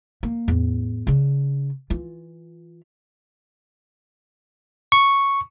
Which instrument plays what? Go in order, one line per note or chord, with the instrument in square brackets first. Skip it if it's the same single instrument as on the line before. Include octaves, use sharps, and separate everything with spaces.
[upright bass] A#3
E2 A2
C#3 D4
E3 F4
[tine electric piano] C#6